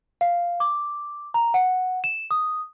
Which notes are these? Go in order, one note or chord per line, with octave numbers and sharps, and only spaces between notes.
F5
D6
A#5
F#5
E7
D#6